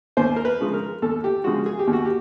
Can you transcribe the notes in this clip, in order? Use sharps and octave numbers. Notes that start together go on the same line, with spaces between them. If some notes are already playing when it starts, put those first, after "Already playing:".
D#2 C5
A#4
B4
C#3 F3 G#3
A#4
D#2 A4
G4
C#3 F3 G#3 F#4
G#4
G4
D#2
F#4
G4